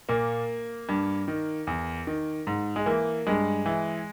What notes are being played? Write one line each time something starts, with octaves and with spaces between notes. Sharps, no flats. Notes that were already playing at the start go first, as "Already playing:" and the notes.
A#2 A#3
G2
D#3
E2
D#3
G#2
G#3
E3 A#3
G2 G#3
E3